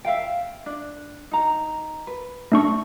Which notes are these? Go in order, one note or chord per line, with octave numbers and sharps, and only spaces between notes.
E5 F5 G5
D4
D#4 A#5
B4
A3 D4 C#6